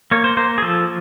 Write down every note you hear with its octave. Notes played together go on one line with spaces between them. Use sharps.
A#3 C#5
C5
A#3 C5
G#4
F3 A4